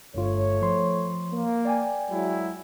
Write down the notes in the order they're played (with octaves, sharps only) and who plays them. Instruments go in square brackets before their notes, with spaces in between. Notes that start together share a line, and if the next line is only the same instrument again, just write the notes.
[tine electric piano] G1 G2 F4 [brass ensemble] A3 C#5
[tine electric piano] F3 C6
[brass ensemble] A#3
[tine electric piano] D5 G5 G#5
[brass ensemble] F#3 G#3 E4